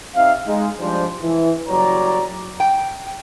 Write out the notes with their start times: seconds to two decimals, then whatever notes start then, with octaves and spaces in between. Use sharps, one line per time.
0.15 C4 D#4 G4 E5 F5
0.46 G#3 D#4
0.80 F3 G3 G#3 D4 C5
1.22 E3
1.68 F#1 F#3 G3 C#5 D5 A#5
2.60 G5